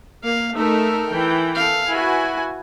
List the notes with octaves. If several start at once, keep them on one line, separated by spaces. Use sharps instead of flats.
A#3 F5
A3 D#4 A4 A#4 E5
E3 G5
A4 F5
E4 F#4 B4 G#5